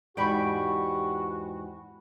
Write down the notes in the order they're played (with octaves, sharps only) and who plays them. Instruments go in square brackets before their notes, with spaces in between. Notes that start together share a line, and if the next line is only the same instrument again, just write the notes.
[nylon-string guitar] E2 G#2 D5 [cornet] F#4 [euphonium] G4 [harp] G5 B5 C#6